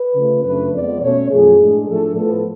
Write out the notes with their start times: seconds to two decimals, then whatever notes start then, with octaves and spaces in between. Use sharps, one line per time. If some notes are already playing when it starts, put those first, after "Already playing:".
Already playing: B4
0.15 C#3 F3 A3
0.44 F#2 C#3 F3 A3 D4 B4
0.73 F2 F3 G#3 B3 D5
1.02 B2 A3 C#4 C#5
1.30 F#2 F3 A3 G#4
1.58 A2 G#3 D4
1.88 A2 F3 A3 D4 A4
2.16 A2 F3 B3 A4